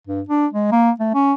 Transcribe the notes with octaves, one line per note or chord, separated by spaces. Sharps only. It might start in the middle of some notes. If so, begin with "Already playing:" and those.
G2
D4
G#3
A#3
A3
C#4